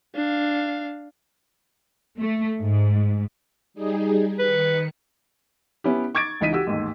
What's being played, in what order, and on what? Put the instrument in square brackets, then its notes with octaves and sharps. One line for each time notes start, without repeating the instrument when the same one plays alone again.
[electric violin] D4 F5
[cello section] A3
G#2
[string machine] G3 D#4 G#4
[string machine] D#3 C#7 [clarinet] B4
[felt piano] B3 C#4 E4 G4
C#6 D6 G#6 A6 D7
C#2 E3 D#4 B6 D#7
F#4 G4 E6
A1 D#2 G#2